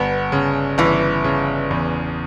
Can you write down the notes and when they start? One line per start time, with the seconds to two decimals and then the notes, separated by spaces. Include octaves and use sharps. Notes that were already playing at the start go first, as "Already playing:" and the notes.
Already playing: G1 B3
0.32 C#3
0.78 G1 E3
1.24 C#3
1.71 E2